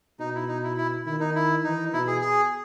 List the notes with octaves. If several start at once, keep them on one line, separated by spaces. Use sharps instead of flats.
B2 D#4
E4
D#4
E4
E4
D#3 E4
D#4
E4
E3 D#4
B2 E4
G#4
G#4